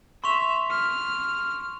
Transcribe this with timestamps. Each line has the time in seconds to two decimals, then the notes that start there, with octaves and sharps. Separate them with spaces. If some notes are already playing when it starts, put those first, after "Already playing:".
0.24 E5 C6 C#6 F7
0.70 F6